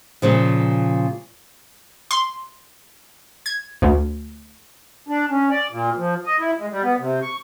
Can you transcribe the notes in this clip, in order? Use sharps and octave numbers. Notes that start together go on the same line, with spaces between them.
A#2 C#3 F3
C6
G#6
D2
D4
C#4
D5
A#2
F3
D#5
E4
G#3
G3
B3
C3
C#6